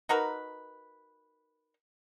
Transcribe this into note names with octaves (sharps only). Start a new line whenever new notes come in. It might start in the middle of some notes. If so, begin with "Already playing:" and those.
D#4 F#4 A#4 B4